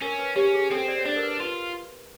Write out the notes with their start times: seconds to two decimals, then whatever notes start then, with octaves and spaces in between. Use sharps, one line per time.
0.02 C#4 A#4
0.19 B4
0.36 C#4 G4
0.54 G#4
0.71 C4 A4
0.88 C5 D5
0.98 C#5
1.06 D4 C5
1.16 A#4
1.23 B4
1.40 F4 B4